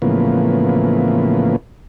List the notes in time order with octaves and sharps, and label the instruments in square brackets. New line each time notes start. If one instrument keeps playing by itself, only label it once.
[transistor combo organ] A2 C#3 E3 F3 A#3 B3